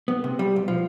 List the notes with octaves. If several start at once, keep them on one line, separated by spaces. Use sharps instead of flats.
B3
C3
G3
B1
F3